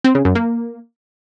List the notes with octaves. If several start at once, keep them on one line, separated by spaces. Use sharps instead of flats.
C4
C#3
F#2
A#3